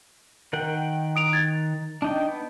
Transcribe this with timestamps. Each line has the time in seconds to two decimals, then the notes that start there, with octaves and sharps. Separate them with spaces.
0.53 D#3 A#4 F#5 G5
1.16 D#6 D7 F7
1.33 G#6 A6
2.02 D4 D#4 G5
2.29 B3